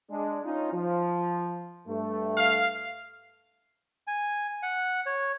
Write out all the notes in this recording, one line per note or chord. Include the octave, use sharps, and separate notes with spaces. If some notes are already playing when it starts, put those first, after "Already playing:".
G#3 D4
C#4 D#4 F4
F3
G2 A3
F5
G#5
F#5
C#5